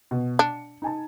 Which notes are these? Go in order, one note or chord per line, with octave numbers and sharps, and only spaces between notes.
B2
D4 C#7
D#4 G#5 A5